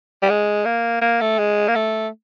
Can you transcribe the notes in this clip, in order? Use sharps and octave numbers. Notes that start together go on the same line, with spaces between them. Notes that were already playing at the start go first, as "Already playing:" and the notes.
G3
G#3
A#3
A#3
A3
G#3
A#3
A3